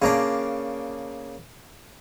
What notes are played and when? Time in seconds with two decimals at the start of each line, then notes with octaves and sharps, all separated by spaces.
0.02 C#3 A#3 D4